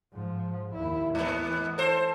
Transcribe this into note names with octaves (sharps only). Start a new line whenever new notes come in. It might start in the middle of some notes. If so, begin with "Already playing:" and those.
G#2 F3
D#2 E4
G#2 E3 B3
A4 C5